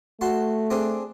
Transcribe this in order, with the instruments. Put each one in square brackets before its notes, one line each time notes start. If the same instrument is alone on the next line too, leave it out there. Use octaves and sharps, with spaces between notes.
[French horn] A3 [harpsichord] F#4 A5 C6
[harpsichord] C4 D4 G#4